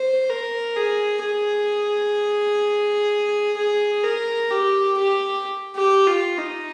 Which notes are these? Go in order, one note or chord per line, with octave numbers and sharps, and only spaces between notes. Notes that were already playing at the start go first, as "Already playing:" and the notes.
Already playing: C5
A#4
G#4
G#4
G#4
A#4
G4
G4
G4
F4
D#4